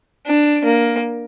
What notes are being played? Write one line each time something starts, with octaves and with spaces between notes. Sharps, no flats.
D4
A#3